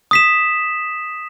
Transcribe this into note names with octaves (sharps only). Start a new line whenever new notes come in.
D#6 B6 E7